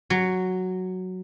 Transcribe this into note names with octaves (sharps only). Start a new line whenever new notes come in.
F#3